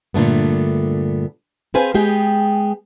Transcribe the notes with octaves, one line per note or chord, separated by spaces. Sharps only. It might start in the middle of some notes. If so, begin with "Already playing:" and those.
G2 A#2 D3 A3 B3
C4 G#4 B4 C5 F5 G#5
G#3 B3 G4 G#4 G5